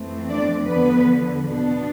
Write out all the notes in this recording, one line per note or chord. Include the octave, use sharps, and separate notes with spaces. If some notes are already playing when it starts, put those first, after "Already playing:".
Already playing: F2 E3 A3 C4
D4 D5
E2 D3 F3 B3 B4
B2 B3 D4